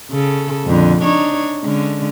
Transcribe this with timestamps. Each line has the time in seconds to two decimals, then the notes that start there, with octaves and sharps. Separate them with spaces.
0.11 C#3 A4
0.65 F2 A#2 D3
1.02 D4 D#4 C#5
1.63 D3 G#3 C#4